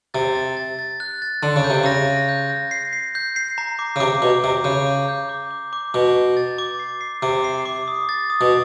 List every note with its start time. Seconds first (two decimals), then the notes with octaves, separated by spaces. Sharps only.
0.14 C3 A6
0.35 A6
0.57 A6
0.79 A6
1.00 F#6
1.22 A6
1.43 D3 C6
1.56 C#3
1.64 G6
1.70 C3
1.84 C#3 A#6
2.08 A#6
2.29 G6
2.50 A#6
2.71 C7
2.93 C7
3.15 G6
3.36 C7
3.58 A#5
3.79 D6
3.96 C#3
4.00 C3 D6
4.22 B2 D6
4.44 C3 D6
4.64 C#3 G6
4.87 D6
5.08 G6
5.29 D6
5.51 D6
5.73 D6
5.94 B2 D6
6.15 D6
6.37 A6
6.58 D6
6.79 C7
7.01 C7
7.23 C3 D6
7.44 C7
7.65 D6
7.88 D#6
8.09 A6
8.30 D#6
8.41 B2